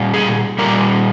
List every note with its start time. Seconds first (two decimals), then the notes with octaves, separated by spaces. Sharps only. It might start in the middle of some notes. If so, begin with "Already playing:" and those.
Already playing: A#2 G3
0.14 G#4
0.58 A#2 G3 A#4